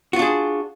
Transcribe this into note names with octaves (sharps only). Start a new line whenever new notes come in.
D4 F4 F#4 G#4